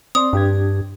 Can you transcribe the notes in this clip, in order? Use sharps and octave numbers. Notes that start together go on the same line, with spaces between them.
C4 D5 C6 D#6
G2 D4 G4 G#6